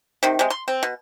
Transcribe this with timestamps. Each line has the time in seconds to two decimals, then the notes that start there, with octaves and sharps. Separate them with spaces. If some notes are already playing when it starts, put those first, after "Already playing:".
0.23 C3 D#3
0.39 C3 G#3
0.50 C6
0.68 C4
0.83 B2